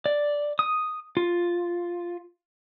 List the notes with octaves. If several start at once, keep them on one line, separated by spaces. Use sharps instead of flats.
D5
D#6
F4